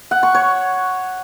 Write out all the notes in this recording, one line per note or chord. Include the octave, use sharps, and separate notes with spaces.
F#5
C#6
C#5